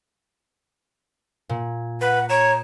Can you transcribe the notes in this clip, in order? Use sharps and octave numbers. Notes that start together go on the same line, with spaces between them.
A#2
B4 F#5
C#5 A#5 D7 E7